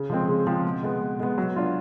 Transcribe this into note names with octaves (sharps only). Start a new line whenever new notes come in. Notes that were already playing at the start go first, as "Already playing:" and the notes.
Already playing: C#3
F3 G#3 C4
C#3
F3 G#3 C4
B2
G#3 B3
B2
G#3 B3
F#3
B3 D4 F4